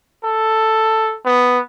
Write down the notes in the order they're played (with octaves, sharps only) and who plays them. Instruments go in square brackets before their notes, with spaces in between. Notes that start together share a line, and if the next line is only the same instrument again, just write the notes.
[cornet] A4
B3